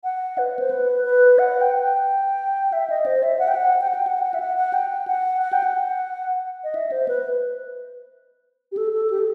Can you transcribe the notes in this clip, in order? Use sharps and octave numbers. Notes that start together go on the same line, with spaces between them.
F#5
B4
C5
B4
B4
F#5
G5
G5
E5
D#5
C5
E5
F#5
G5
F#5
G5
F#5
G5
F#5
F#5
E5
F#5
F#5
G5
F#5
F#5
G5
F#5
D#5
E5
C5
B4
G4
A4
A4
G4
A4